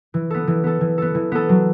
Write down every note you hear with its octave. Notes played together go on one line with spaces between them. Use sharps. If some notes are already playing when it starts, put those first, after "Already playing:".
E3
B3 A4
E3
B3 A4
E3
B3 A4
E3
B3 A4
F#3